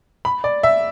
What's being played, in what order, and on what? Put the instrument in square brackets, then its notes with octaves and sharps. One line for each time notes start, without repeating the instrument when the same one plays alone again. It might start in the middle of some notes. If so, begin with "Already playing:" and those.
[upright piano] B5
D5
E5